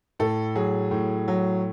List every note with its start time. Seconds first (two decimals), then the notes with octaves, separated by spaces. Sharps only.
0.19 A2 A4
0.55 F#3 G#4
0.91 A2
1.28 F#3